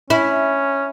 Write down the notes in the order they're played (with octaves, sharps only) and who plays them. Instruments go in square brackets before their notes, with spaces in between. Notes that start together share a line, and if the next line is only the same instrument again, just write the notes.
[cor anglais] C#4 [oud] E4